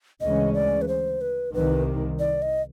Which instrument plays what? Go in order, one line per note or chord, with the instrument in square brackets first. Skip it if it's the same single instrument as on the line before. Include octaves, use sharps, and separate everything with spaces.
[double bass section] D2 C#3 E3 G#3 C#4 [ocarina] D#5
[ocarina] D5
B4
C5
B4
[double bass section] C2 C3 D#3 [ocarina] B4
[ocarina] D5
D#5